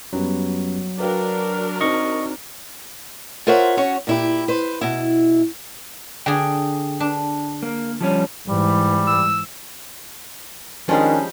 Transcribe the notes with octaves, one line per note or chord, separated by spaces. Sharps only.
F#2 F#3 G3 B3
D4 F#4 A#4 B4 F5 G5
C4 D#4 D#5 C#6
F4 A#4 C5 C#5 E5 F#5
C#4 F#4 C#5
A#2 E4 G4
B4 C5
B2 E4
D3 G#4 G5
D4
A#3
F3 G3 C#4
G#2 E3 G3
E6
D#3 F3 G3 G#3 C#4 D4